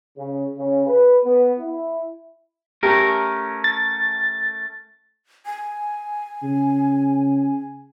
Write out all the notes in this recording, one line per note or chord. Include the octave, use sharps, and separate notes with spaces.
C#3
C#3
B4
B3
E4
A3 C#4 G4 A#4
A6
G#5
C#3